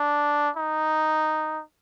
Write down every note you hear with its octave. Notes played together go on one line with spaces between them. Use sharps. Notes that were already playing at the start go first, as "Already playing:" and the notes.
Already playing: D4
D#4